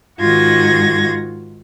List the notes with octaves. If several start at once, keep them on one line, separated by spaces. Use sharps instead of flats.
G#2 D#3 F4 F#4 G#6 A#6